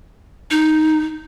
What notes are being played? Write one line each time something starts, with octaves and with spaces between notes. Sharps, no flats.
D#4